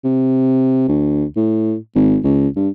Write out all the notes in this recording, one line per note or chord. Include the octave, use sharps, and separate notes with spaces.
C3
D2
A2
G#1
C#2
G2